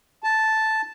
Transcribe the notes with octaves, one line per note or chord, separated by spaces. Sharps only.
A5